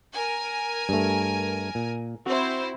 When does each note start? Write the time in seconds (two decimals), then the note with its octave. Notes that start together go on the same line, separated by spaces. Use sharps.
0.13 A#4 G#5
0.89 G2 A3
1.75 A#2
2.26 C4 E4 F#4 C5